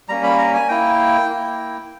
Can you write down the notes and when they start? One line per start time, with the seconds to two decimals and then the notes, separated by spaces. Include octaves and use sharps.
0.09 G3 A#3 C#4 A#5
0.23 B5
0.38 A#5
0.54 G#5
0.68 A#3 E4 G5
1.29 A#3 E4